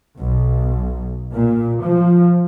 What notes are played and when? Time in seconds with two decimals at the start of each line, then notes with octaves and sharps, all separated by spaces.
0.19 B1
1.33 A#2
1.83 F3